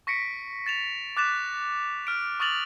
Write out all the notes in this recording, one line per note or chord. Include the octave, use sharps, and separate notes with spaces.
C#6 A#6 B6 C#7 D7
A6 E7 F7
D6 F#6 A6 B6 E7
F6 D7
C#6 D#6 F6 A6 F7 F#7